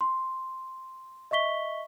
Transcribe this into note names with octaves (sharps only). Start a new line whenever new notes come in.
C6
D#5 E5 C#6 B6 G7